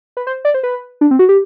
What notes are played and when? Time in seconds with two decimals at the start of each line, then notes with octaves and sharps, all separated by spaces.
0.17 B4
0.27 C5
0.45 D5
0.54 C5
0.63 B4
1.01 D4
1.11 C4
1.19 F#4
1.29 G4